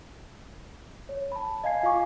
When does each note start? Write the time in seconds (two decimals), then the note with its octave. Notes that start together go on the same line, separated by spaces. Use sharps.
1.09 C#5
1.32 A5 B5
1.64 D#5 F5 G#5 G#6 C7
1.83 F4 F5 G#5 C#6 D6